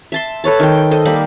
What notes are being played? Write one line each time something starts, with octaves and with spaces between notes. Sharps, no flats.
E5 A5 C6
A4 B4 C#5 A5
D#3 G5
A4 C5 D#5
G3 A#3 G4 B5